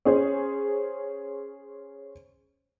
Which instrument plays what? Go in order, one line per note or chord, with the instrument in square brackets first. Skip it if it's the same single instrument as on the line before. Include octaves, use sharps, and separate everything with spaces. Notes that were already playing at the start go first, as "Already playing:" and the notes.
[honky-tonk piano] C#4 G#4 C5